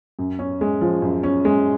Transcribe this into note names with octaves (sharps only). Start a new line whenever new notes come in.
F#2
C#4
G#3
F3
F#2
C#4
G#3